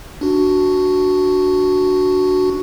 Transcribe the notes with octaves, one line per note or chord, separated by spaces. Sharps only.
D4 F#4